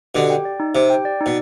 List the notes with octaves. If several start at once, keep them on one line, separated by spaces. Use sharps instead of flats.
B2 D3 G4
G5
D5
D#4
C3 G4
G5
D5
D#4
B2